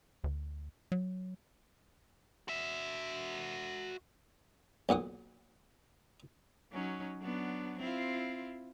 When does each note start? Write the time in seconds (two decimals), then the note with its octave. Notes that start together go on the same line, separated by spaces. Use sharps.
0.24 D2
0.92 F#3
2.48 F#4 E5
4.89 B1 A#2 F#5 D#6
6.72 F#3 C#4 D#4
7.22 F#3 B3 D4
7.79 C4 E4 F4